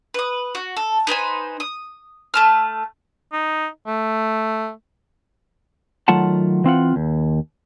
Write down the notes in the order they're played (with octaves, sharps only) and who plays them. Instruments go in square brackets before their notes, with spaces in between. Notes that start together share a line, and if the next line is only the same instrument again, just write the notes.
[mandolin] B4 D#6
F#4
A4
D#4 B4 C5 G#5
D#6
A3 A5 F6
[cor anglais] D#4
A3
[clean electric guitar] D#3 F#3 A3 F4 F#5 A5
E3 C4 F4 F#5
D#2